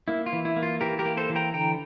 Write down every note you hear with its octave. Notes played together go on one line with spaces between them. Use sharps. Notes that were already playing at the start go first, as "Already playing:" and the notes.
A#3 E4
F4
E3
E4
A#3
F4
E3 G4 A#4
G4 A#4
A#3
A4 C5
E3
G5 A#5
D3 G5 A#5